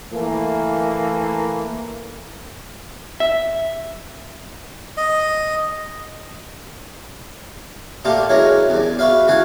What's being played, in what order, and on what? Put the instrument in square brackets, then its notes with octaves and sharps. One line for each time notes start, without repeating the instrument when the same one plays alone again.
[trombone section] E3 A3 A#3
[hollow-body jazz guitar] E5
[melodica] D#5
[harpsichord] A#2 A3 A#3 F4 G4
E3 F#3 G#3 C#4 A#4
E2 G2
F#4 B4 E5 F5
C#2 E3 F#4 F5 F#5 G#5